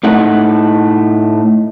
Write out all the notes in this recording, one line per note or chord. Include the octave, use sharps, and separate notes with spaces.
A2 A3 D#4 F#5